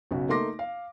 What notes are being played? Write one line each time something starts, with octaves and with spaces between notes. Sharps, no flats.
B1 C#3 F#4
A3 A#3 D#4 C6 D6 A#6
F5